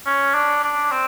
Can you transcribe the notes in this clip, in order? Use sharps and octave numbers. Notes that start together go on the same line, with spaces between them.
C#4
D4
D4
C4